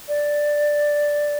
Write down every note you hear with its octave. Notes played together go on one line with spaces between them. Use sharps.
D5